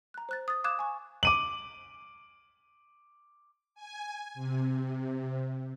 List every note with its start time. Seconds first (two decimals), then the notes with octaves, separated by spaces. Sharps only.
0.14 A#5 F#6
0.29 C5 F#6 A6
0.48 D#6 A6
0.64 F5 D6 D#6 F#6 G#6 E7
0.79 G#5 C#6
1.23 D6 D#7 F#7
3.75 G#5
4.34 C3